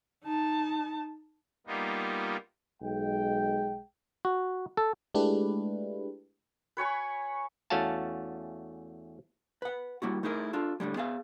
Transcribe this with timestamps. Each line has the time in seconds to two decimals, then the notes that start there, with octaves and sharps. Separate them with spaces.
0.23 D#4 A5
1.67 G3 A#3 B3 D#4 F4
2.83 B1 G#3 G5
4.25 F#4
4.77 A4
5.14 G#3 A3 D4 E4 G4 B4
6.77 B4 C#5 G#5 C#6
7.70 E2 A3 C#4 F#4 F5 A5
9.62 B4 F#5
10.02 G3 A#3 E4 F#4
10.23 A3 D#4 E4 G#4 A#4
10.53 D4 F4 A4
10.80 A2 D3 G3 G#3
10.96 B3 G#4 E5 F5